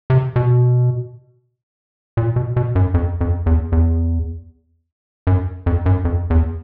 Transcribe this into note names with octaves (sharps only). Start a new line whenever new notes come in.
C3
B2
A#2
B2
B2
F#2
F2
F2
E2
E2
F#2
F2
F#2
F2
E2